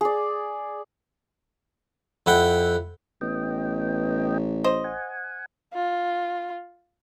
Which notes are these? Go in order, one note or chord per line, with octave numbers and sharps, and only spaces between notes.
G#4 D5
F2 E4 F#5 G5
A1 B3 D#5 G5
C5 D#5
F#5 G#5
F4